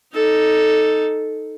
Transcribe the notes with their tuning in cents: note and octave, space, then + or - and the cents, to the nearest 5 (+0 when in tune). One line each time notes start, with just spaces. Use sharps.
D#4 +0 A4 +0